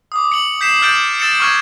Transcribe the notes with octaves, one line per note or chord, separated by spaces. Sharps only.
D6 D#6
C#7 F#7
G6 B6 C7 E7
F6 G6 A6 D7
E6 A6 C#7 E7
C#6 F6 G#6